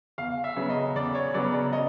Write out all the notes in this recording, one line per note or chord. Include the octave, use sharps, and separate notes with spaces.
E2 F5
E5
C#3 F#3 B3
D#5
E2 D5
C#5
C#3 F#3 B3 D5
D5
D#5